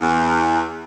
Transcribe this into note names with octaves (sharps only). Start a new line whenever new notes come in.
E2